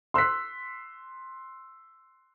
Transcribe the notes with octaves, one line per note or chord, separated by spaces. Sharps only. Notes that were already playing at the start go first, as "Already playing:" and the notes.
C6 E6 F#6 B6